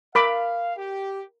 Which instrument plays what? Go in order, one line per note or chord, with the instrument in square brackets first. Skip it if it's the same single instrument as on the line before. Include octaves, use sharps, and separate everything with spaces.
[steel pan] A#4 B5 D6 [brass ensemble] F5
[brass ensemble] G4